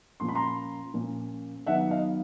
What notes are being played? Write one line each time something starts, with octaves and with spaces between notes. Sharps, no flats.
A#2 F3 A#3 C#4 C6
B5
A#5 C6
A#2 F3 A#3 C#4
D#3 F#3 B3 E5 F#5
D#5 F5